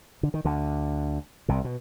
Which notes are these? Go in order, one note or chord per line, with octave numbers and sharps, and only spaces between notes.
D3
D#3
D2 D3
C2 C3
B2